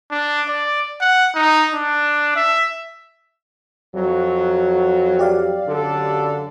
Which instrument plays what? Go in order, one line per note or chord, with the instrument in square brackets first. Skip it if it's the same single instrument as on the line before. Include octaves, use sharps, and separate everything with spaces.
[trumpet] D4
D5
F#5
D#4
D4
E5
[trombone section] F2 F#3
[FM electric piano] G4 D5 F5
[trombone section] F#2 D3 A4